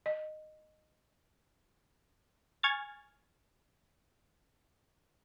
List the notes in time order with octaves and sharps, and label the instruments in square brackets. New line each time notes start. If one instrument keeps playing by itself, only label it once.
[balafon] D#5
[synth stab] G#5 C#6 F6 G#6 A6